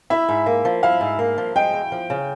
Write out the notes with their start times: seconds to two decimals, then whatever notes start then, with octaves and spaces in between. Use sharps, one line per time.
0.10 E4 E5
0.29 G#2
0.46 A#3
0.65 F3
0.83 E4 F5
1.01 G#2
1.19 A#3
1.38 F3
1.56 G#3 G5
1.74 E2
1.92 F3
2.10 C#3